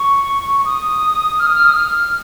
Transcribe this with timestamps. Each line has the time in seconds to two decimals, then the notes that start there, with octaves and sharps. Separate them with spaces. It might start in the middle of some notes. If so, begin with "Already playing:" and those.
Already playing: C#6
0.65 D#6
1.39 F6
1.47 D#6
1.55 F6
1.67 D#6
1.75 F6